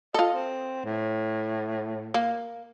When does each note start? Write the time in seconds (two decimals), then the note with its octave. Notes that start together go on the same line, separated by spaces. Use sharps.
0.14 F4 A4 D#5
0.34 C4
0.85 A2
2.14 A#3